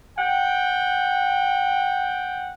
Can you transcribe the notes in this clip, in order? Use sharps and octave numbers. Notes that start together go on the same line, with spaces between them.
F#5 G5